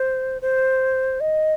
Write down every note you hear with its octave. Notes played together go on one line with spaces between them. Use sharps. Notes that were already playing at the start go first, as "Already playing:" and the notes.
Already playing: C5
C5
D#5